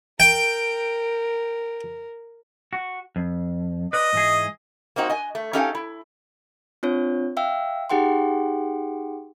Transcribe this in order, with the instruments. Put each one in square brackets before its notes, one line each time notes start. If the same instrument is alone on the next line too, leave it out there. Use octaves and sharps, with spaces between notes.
[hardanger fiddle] A#4 [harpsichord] G5
[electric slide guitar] F#4
F2
[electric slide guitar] B4 D5 [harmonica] D#5
[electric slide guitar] G#2 E3 G#4
[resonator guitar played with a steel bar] A#3 C4 D#4 F#4
D#5 G#5
A3
C#4 D#4 G4 A4 F5 G#5
E4
[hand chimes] C4 D4 F4 C#5
E5 F5 G5 E6
D#4 G4 G#4 F#5 G5 C6